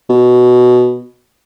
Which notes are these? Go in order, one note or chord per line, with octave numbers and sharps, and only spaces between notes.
B2